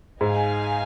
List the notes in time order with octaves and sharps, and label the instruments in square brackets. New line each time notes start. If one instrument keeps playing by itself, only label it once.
[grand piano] G#2 [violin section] D#4 G#4 F5 G#5